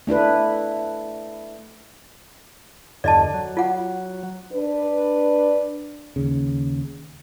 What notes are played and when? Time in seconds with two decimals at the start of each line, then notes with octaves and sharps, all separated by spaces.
0.07 A3 D4 E4 B4
3.04 E2 G2 D3 D5 D#5 A5
3.34 F#3
3.57 F4 F#5
4.53 D4 B4
6.16 D#2 C#3